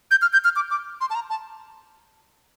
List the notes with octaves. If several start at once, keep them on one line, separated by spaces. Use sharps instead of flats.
G6
F6
G6
F6
D6
D6
C6
A5
A#5
A5